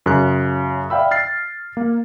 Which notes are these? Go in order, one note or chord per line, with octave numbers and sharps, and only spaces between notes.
F#2 C#3 F#6
D5 E5 F5 G5 B5 E6
F6 A6 C7
A#3